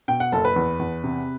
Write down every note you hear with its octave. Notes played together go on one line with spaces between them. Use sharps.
B2 G5
F#5
F#1 A4
B4
E2
E2
C3